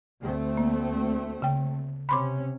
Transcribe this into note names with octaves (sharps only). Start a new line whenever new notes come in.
D2 A3 C4
A#3
C#3 G5
C3 C#4 B5 C6 D6